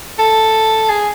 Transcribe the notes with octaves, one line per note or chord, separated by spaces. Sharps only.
A4
G#4